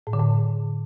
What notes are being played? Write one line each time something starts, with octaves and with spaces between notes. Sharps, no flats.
A2
D3
A2